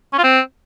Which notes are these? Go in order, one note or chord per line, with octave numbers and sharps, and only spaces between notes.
C#4
F4
C4